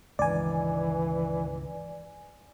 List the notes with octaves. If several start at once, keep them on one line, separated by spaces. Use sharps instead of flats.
C#2 G2 D#3 E3 D5 G#5